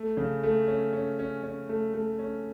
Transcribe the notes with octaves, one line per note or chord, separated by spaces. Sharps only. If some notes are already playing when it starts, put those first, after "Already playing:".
Already playing: A3
C#3
A3
C#4
C#4
C#4
C#4
A3
A3
C#4